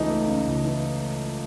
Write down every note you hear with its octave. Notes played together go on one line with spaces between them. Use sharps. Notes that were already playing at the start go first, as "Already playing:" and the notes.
Already playing: C#2 C#3 E3 A3 D#4 G#4
A3
C#3
C#2
E3